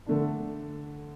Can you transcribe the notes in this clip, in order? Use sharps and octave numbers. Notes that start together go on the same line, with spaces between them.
D3 A3 D4